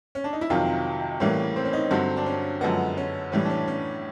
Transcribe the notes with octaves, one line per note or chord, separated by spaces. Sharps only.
C#4
D4
D#4
E4
F2 C3 D#3 F#3 F4
A2 E3 G3 A#3 C#4
C4
C#4
D#4
G2 D3 F#3 C4
D4
C#4
F#2 D3 F3 G#3 B3
C#4
A2 E3 G3 C#4
D4
C#4
C#4